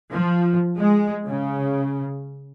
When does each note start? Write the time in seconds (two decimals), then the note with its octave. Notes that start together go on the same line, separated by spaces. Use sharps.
0.11 F3
0.78 G#3
1.26 C#3